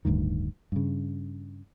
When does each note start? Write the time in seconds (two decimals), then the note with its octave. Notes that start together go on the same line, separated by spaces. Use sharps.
0.05 D1 D2 G2 D#3
0.72 G2 C#3